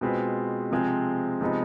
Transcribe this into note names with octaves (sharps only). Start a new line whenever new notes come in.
B2 G#3 C4 F4 B4
C3 F3 G#3 C4
C3 F3 G#3 B3 D#4